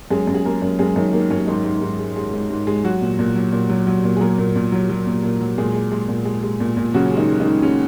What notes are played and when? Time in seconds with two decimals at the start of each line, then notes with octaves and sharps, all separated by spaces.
0.11 F#2 G#3 G#4
0.27 F#2
0.34 G#4
0.45 G#3 A#3 A#4
0.62 F#2
0.79 F#2 G#3 G#4
0.96 F#2 D#3 D#4
1.13 D#3 A#3
1.30 F#2 C#4
1.47 G#2 D#3 D#4
1.64 G#2
1.81 G#2
1.99 G#3
2.16 G#3
2.33 G#2
2.50 G#2
2.67 G#3
2.84 F#3 F#4
3.01 A#2
3.19 A#2
3.35 F#3
3.52 A#2
3.69 F#3
3.87 F#3
4.04 A#2
4.17 G#4
4.21 F#3 A#3 A#4
4.38 A#2
4.55 A#2
4.72 F#3
4.89 F#3
5.06 A#2
5.24 A#2
5.41 F#3
5.58 A#2 G#3 G#4
5.75 G#3
5.92 G#3
6.08 A#2
6.25 G#3
6.43 G#3
6.60 A#2
6.77 A#2
6.94 C#3 F#3 F#4
7.06 C#4
7.11 G#3
7.17 D#3 D#4
7.29 G#3
7.40 D#3 D#4
7.46 G#3
7.62 G#3 C#4